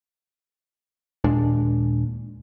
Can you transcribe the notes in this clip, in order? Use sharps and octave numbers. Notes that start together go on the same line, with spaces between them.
D#2 A#2 G#3 D4